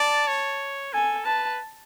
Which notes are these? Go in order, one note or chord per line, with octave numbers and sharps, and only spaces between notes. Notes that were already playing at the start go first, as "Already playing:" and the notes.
Already playing: D5 A5
C#5
A4 G#5
B4 A5